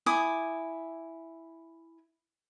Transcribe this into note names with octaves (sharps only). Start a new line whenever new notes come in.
E4 G#5 D6 D#6